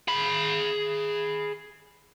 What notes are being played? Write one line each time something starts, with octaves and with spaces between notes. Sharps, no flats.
G#4 B5